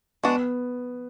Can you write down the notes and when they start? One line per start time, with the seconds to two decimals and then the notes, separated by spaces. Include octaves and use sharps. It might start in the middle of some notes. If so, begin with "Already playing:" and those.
0.23 G#3 B3 D4 F#4